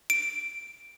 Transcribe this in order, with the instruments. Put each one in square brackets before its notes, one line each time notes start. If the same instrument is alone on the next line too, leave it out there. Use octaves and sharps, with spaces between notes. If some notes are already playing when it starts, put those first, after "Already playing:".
[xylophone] D7